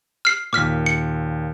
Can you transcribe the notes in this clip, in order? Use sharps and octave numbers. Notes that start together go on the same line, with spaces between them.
F6 C7
D#2 A#2 D6 F6 B6
C#7